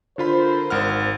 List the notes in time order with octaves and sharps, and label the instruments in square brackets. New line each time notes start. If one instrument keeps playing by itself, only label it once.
[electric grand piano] D3 F4 B5 [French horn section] A#4 C5
[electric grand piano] G#1 F#5 F6